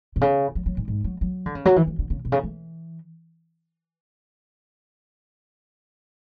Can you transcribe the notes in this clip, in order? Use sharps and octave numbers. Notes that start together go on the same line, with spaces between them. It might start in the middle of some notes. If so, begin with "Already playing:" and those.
B2
C#3
F#3
F#3
G#2
G#2
F#3
F#3
D3
C#3
F#3
E3
E3
D3
C#3
B2
C#3
E3